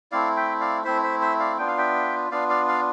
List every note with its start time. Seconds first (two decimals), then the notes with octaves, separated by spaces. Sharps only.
0.12 A3 C4 E4 D5 F5
0.36 E5 G5
0.60 D5 F5
0.84 A3 C4 E4 C5 E5
1.03 C5 E5
1.21 C5 E5
1.40 D5 F5
1.58 B3 D4 F4 G5
1.67 F5
1.78 E5 G5
2.31 B3 D4 F4 D5 F5
2.49 D5 F5
2.68 D5 F5